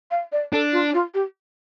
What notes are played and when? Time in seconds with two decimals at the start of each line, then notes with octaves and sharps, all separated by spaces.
0.11 F5
0.32 D5
0.53 D4 A4
0.73 F4
0.94 F4
1.14 G4